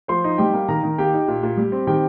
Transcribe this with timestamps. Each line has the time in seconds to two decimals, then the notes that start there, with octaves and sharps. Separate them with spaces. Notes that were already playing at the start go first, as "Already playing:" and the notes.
0.08 F3 C5 C6
0.24 D#4
0.38 G3 G4 G5
0.54 A#3
0.68 D#3 A#4 A#5
0.83 D#3
0.98 A#3 G4 G5
1.14 D#4
1.28 A#2
1.43 A#2
1.57 G3
1.72 C4
1.87 D#3 G4 G5